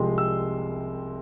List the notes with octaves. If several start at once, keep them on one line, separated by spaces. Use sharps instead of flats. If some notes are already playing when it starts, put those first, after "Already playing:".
Already playing: C2 C3 F3 G#3 C6
E6